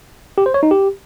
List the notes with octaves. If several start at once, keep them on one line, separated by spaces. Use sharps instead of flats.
G4
C5
C#5
D#4
G4